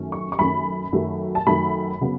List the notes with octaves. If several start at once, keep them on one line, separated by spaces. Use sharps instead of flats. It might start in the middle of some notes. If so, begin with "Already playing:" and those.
Already playing: F#2 D#3 A3 C#4
C#6
C#6
F#2 D#3 A3 C#4 B5
F#2 D#3 F#3 A3
A5
F#2 D#3 F#3 A3 B5
C#3 F#3 B3